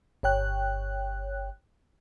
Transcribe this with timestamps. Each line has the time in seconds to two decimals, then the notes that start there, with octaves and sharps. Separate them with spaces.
0.23 G1 C#5 G5 F#6